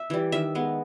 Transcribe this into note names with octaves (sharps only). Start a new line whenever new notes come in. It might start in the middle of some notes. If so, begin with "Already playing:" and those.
Already playing: E5
E3 G3
D#3 E5
G#3 B3